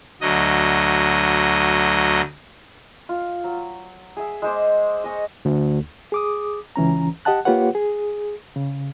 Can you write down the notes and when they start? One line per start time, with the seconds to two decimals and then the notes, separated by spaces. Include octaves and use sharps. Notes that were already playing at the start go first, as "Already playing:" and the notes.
0.21 D2 F#3 D#5
3.09 F4
3.44 F#3
4.17 G#4 E5
4.42 G#3 C5 D6
5.04 D#5 G#5 C#6
5.45 D2
6.12 G#4 D6 D#6
6.76 C#2 E3 C#4 A#5
7.25 G4 D#5 F#5 A5 F#6
7.45 A#3 F4 G4 B4 C#5 F#5
7.75 G#4
8.56 C#3